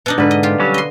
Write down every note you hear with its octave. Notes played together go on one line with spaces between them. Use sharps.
B2 D4 D#4
G#2 D3 B4
D#5
F4 G4
F#3 G3 C#4
D#5 C6